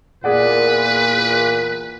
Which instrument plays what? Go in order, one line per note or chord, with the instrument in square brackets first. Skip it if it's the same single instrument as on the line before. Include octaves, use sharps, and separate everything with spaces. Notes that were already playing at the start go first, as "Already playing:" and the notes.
[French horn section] E2 A#2 [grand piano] G#4 D5 F#5 [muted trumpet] B4